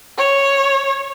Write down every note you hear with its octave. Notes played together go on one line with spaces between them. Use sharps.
C#5